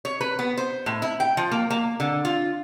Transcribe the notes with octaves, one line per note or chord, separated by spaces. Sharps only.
C#5
B4
B3
C5
A2
E4
G5
F3
A#3
A#3
D3
F4